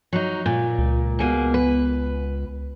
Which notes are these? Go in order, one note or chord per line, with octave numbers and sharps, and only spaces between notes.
F#3 D#4
A#2
C#2
B2 A#3 G#4
B4